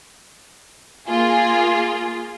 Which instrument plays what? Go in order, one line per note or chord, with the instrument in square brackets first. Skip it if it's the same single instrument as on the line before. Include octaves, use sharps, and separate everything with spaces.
[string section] A#3 F4 G#4